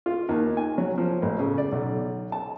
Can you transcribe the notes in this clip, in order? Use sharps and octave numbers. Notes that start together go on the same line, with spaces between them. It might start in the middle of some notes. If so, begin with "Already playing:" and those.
F4
D#2
G#5
F#3
F3
A1
C#3
D5
B1
A5